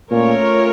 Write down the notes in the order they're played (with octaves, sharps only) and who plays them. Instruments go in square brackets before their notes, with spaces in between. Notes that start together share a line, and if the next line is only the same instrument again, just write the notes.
[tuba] A#2 [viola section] A3 C#4 F4 A#4 C#5